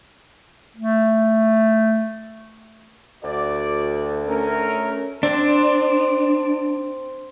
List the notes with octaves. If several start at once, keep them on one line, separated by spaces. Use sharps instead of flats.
A3
D2 F#4 D5
A3 C#4 A#4
C4 D4